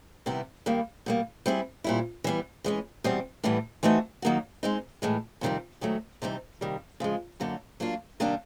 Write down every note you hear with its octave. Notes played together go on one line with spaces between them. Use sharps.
C3 D#3 G3 B3 E4
G2 D#3 G3 A#3
B2 G3 A#3
G3 C4 E4 G#4
A#2 G3 C4 E4
E3 G3 B3
E3 G#3 C#4
E2 B2 G3 C4
A2 E3 G3 B3
E3 A3 C4 D#4 F#4
D#3 F#3 A#3 D#4 F#4
G#3 C4 D#4
A2 E3 G#3
F2 C3 D#3 G3 C4
G#2 D#3 F#3 A3
C3 E3 G3 C4 D#4
C3 D#3 G3 A#3
C#3 F3 G#3
F#2 D3 F#3 A#3 D#4
F#3 A#3 D4 F4
C3 D#3 G3 A#3 D4